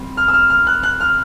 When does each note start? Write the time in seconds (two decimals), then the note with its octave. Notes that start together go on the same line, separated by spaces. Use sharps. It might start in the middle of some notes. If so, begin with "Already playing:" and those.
Already playing: G3 C4
0.17 F6
0.28 E6
0.34 F6
0.50 F6
0.67 F#6
0.83 F#6
1.00 F6